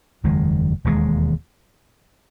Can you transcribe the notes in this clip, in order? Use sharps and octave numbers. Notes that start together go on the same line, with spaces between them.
F#1 E2 D#3 G#3
E1 D#2 D#3 G#3